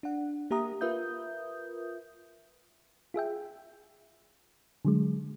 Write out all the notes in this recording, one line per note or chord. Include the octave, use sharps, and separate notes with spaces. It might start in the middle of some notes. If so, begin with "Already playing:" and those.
D4 F#5
A#3 G4 E5 A#5 D#6
F4 A#4 B4 E5 D#6 G6
F4 G#4 E5 G5
D3 F#3 G#3